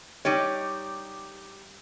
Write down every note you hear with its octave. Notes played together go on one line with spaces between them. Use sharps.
G3 D#4 G4 C#5